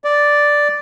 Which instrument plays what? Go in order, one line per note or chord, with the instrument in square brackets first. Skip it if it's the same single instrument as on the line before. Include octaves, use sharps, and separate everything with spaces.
[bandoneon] D5